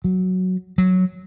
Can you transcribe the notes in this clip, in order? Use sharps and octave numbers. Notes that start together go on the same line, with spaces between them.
F#3
F#3